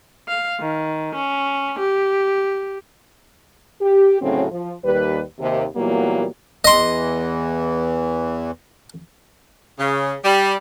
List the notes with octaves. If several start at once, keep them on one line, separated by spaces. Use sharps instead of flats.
F5
D#3
C#4
G4
G4
D2 A2 C#3 F#3 C4 C#4
F3
D#2 G3 B4
D#2 C3
A#2 E3 F#3 G3 A#3 B3
E2 E3 D#5 C6
C#3
G3